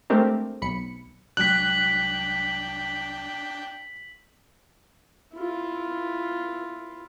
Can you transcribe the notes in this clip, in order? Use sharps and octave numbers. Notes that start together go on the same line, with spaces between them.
G#3 A3 C4 D4 G4 A#4
B1 B5 C#7
C2 F#3 G#3 D4 G5 F#6 B6 F#7
E4 F4